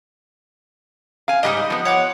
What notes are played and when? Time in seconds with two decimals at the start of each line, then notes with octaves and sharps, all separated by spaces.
1.28 F5 G#5
1.43 G#2 G3 D#4 B4 D#5
1.70 F3 B3
1.85 C#5 F#5 D6